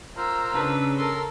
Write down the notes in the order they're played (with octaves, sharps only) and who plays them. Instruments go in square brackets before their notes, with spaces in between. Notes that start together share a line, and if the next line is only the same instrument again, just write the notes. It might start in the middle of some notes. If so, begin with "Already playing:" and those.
[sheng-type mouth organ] F4 A#4 C5 [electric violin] A#5 E6
[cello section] C#3 [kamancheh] D4 B4
[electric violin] A4 A#4 [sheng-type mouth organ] C6 E6